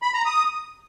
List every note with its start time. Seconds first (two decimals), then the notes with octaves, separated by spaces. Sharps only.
0.02 B5
0.14 A#5
0.26 D#6